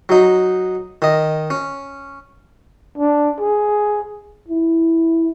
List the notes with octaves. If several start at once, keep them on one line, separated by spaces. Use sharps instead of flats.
F#3 D#4
D#3 D#5
C#4
D4
G#4
E4